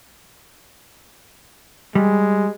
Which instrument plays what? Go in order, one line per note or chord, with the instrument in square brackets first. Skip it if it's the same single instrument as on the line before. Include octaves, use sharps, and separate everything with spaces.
[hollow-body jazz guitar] G3 [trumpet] G#3